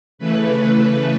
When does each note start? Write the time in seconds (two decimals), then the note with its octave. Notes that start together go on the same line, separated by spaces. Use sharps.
0.18 C#3 E3 A3 B4